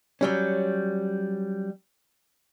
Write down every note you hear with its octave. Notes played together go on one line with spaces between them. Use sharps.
F#3 G3 C#4